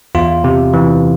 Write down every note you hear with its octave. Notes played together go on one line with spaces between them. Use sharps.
E2 F4
C3
E3